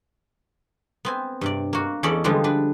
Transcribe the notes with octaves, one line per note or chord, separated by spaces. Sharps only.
B3 C4 G#5
G2 C3 D5
A#3 F#4
E2 C#4 A4 D5 D#5 B5
D3 F3 G3 G#3 B3 D4
D4 B4